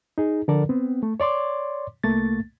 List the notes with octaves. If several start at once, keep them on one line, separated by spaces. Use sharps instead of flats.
D#4 G#4
D3 F3 A4 A#4 D5
B3 C4
A3
C#5 D5 C6 D6
C2 A3 A#3 A6